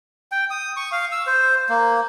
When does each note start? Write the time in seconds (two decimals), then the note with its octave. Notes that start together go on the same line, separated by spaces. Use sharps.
0.32 G5
0.51 D#6
0.76 C#6
0.92 F5
1.12 E6
1.27 C5
1.69 A#3